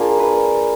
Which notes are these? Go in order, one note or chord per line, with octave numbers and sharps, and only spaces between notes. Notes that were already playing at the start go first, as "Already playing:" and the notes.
Already playing: A#3 D4 F4 G#4
B4